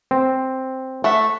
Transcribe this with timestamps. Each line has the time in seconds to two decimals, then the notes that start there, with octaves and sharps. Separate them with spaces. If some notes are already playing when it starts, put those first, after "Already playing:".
0.11 C4
1.04 A3 E5 F#5